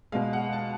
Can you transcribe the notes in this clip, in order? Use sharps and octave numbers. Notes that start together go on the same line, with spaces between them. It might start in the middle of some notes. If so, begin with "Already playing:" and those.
B2 G#3 F5
F#5
A5